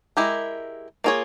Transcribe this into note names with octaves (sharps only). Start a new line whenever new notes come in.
G#3 E4 G4 A#4
A#3 F4 G#4 C#5